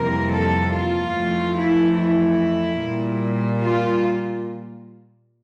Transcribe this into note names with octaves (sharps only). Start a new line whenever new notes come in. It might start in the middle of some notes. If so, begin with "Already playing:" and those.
Already playing: F2 C3 E3 G3 A#3 A#4
A4
F4
F2 E3 A3
E4
E4
A#2 G3 A#3
F4